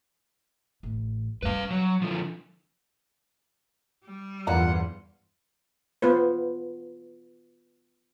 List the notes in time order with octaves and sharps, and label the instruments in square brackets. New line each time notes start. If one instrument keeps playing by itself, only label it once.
[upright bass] A1
[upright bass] G3 C#4 [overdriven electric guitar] B4 F5
[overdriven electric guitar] F#3
D3 F3
[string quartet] G3
[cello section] E2 G2 F4 [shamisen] D3 F3 A#4 [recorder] F#5
[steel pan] B3 F4 B4 C5